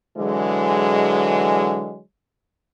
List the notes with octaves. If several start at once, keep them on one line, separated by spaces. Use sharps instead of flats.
D3 E3 F#3 G#3